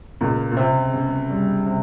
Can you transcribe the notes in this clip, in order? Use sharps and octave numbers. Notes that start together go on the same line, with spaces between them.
C#2 A#2
A#2
C3 C4
C#3
G3
C3